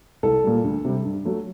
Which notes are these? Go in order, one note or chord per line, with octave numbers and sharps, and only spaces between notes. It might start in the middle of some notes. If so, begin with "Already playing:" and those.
C2 A4
A#2 G3
D2
C3 G3
G2
F#3 A3